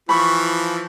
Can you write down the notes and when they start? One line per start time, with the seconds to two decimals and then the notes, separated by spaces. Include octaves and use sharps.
0.09 E3 F3 B5 C#6